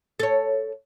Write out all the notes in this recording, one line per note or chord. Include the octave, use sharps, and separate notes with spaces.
A4 C#5